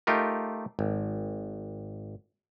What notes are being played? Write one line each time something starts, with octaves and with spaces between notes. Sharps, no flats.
A3 D#4 F4 G4 A#4
G#1